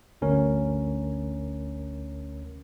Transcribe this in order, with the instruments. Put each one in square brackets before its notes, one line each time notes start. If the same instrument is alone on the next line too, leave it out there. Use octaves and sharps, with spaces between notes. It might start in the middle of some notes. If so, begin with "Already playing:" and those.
[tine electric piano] G1 D2 C#4 A#4